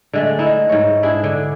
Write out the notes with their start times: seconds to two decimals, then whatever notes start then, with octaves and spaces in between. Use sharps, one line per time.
0.13 D3 G#3 A3
0.39 D#4 E4
0.69 G#2 C#5
1.03 D4 E4 G#4
1.24 D3